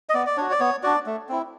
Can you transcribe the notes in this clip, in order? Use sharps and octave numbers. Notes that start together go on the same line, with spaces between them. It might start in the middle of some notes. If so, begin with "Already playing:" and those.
D#5
B3 D5
D5
D4 F#4 C#5
D5
B3 C#5
D4 F#4 D5
A3
C4 E4